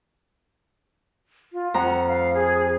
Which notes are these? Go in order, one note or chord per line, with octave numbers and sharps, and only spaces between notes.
F4
F2 F#5 A#5
F5
G#4